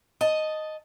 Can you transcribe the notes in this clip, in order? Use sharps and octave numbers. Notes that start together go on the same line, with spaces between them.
D#5 A5